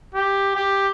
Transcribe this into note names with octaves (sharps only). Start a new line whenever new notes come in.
G4
G4